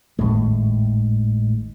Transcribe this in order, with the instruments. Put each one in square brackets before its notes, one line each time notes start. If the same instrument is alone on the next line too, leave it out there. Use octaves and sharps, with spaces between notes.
[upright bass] G#1 D#2 [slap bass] A2 G#3